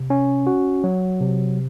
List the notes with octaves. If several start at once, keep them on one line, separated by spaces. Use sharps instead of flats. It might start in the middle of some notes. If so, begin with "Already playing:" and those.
Already playing: C3
C#4
F#4
F#3
C3